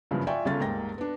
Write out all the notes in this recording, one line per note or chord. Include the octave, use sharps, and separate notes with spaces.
F#1 G2 C#3 E3 F3
F4 D5 E5 G5 G#5 C#6
G1 C#3 C#4 F4 A4 A6
D#1 G#2 A#3 G5 A#6
B3 D4